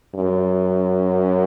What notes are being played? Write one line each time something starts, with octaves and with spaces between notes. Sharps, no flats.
F#2